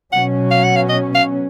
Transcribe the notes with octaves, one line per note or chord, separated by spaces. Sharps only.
B2 F#3 C#4 F#5
F5
F#5
F5
D#5
F5